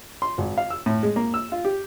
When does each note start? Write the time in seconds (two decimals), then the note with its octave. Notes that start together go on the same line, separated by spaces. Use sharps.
0.22 C6
0.38 G#1
0.58 F5
0.70 E6
0.86 A2
1.03 G#3
1.16 A#3
1.34 E6
1.52 F4
1.64 G4